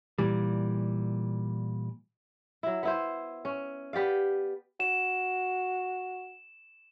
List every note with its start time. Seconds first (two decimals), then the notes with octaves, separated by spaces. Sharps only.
0.19 A#2 E3 G3
2.63 F#3 E4
2.83 B3 E4 C5
3.45 C#4
3.93 B3 G4 D5 F5
4.80 F#4 E7